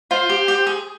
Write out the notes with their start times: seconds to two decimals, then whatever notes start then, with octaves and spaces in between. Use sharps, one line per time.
0.11 F4 C5
0.29 G4
0.48 G4
0.67 G#4